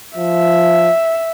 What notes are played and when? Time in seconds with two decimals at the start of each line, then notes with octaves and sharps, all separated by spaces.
0.17 F3 E5